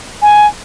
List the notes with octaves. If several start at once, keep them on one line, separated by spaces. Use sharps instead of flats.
G#5